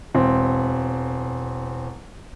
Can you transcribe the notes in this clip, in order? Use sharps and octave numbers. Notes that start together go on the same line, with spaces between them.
E1 C4